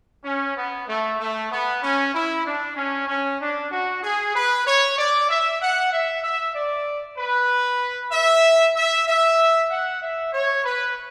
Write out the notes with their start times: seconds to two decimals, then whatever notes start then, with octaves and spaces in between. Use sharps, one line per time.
0.25 C#4
0.56 B3
0.88 A3
1.19 A3
1.51 B3
1.82 C#4
2.13 E4
2.45 D4
2.77 C#4
3.08 C#4
3.39 D4
3.71 F#4
4.02 G#4
4.34 B4
4.66 C#5
4.97 D5
5.29 E5
5.60 F#5
5.92 E5
6.24 E5
6.54 D5
7.18 B4
8.12 E5
8.75 E5
9.07 E5
9.70 F#5
10.01 E5
10.33 C#5
10.64 B4